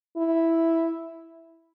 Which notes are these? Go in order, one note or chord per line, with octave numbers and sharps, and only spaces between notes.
E4